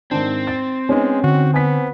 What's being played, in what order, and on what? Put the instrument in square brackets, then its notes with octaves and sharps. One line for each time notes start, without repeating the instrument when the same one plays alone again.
[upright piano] G#2 D#3 D4 [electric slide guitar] C4
[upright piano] A6
[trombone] G#3 [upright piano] B3 C#4 D#4
[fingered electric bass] D3 [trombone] F#4
[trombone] B3 [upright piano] G#5 B6